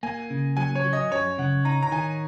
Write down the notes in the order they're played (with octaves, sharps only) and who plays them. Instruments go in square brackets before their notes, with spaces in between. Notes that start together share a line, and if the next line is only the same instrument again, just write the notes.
[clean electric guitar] A#3 [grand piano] G#5
[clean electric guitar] C#3
[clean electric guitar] F#3 [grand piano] G#5
[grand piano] C#5
[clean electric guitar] F#3
[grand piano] D#5
[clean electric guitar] F#2 [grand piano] C#5
[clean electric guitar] C#3 [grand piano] F#5
[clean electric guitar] D#4 [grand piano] A#5
[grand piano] A#5
[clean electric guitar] D#3 [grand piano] G#5